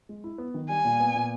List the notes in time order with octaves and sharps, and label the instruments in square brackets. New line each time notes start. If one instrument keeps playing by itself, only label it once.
[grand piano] G#3
E4
B3
D#3
[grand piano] G3 [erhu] G#5
[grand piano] A#2
B3
A#2